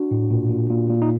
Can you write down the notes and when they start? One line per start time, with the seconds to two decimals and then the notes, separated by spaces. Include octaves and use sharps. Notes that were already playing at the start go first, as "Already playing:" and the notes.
Already playing: D4 F#4
0.11 A2
0.31 A#2
0.50 A#2
0.70 A#2
0.90 A#2
1.02 D#4